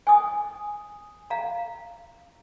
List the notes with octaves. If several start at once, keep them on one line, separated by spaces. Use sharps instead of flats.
G#5 D#6
F5 A#5